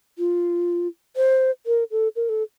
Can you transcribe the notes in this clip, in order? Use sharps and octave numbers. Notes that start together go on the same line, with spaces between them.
F4
C5
A#4
A4
A#4
A4